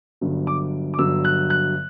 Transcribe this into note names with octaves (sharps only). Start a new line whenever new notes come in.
G1 G2 F#3
D6
D6
G1 G2 F#3 E6
F#6
F#6